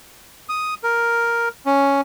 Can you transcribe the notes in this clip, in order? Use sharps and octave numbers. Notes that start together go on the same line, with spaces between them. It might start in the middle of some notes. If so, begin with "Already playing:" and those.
D#6
A#4
C#4